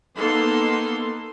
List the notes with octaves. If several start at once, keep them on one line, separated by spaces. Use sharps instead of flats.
A#3 B3 D#4 A4 C6